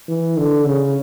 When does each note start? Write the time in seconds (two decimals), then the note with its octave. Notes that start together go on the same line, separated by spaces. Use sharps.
0.08 E3
0.37 D3
0.66 C#3